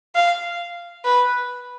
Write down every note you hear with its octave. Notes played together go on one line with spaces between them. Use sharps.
F5
B4